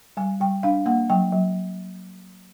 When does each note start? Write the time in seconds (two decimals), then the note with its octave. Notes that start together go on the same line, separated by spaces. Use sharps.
0.17 G3 G#5
0.40 G3 G5
0.63 D4 F5
0.86 A#3 F#5
1.10 F#3 G5
1.32 F#3